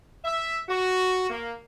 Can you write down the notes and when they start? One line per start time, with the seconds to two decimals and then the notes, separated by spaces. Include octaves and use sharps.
0.25 E5
0.69 F#4
1.29 A#3